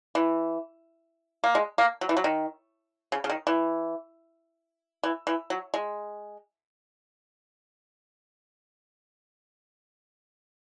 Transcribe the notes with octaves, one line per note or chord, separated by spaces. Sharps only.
E3
A#3
G#3
A#3
F#3
E3
F#3
D#3
C#3
C#3
D#3
E3
E3
E3
F#3
G#3